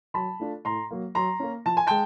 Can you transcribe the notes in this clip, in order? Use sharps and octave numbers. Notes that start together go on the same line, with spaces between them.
F#3 A5 B5
A3 D4 F4
A2 A#5 C6
F#3 A#3
F#3 A#5 C6
A#3 C#4
F3 A5
G#5
G#3 G5 A5